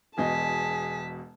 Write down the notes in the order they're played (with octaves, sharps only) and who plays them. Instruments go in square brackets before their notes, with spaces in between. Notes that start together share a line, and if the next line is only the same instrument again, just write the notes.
[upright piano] E1 B2 D#5 [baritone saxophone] G#4 [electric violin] A5 B6